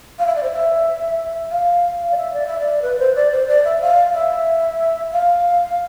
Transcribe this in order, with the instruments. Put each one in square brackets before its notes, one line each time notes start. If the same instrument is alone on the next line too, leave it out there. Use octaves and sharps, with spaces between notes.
[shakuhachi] F5
E5
D5
C5
E5
F5
D5
E5
D5
E5
D5
B4
C5
D5
C5
D5
E5
F5
E5
F5